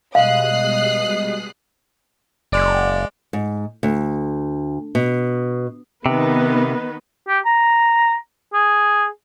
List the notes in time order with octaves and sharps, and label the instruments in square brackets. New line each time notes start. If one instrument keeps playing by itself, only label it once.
[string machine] B2 G3 G#3 [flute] D#5 [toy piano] F5 [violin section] D#6 F#6 C7
[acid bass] F#1 [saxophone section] G#3 D5
[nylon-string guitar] G#2
D2
B2
[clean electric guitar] C3 [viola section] D#3 B3 B4
[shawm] G4
A#5
G#4